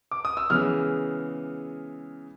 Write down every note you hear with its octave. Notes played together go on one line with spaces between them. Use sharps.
D6
D#6
E6
C#3 E3 G#3 B3 F6